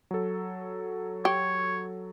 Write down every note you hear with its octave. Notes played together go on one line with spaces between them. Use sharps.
F#3 A4
G4 C#5